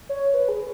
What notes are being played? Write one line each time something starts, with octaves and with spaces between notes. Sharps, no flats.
C#5
B4
G#4